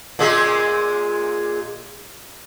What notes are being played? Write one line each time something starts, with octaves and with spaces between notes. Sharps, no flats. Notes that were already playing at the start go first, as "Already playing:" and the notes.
A#2 G#3 G#4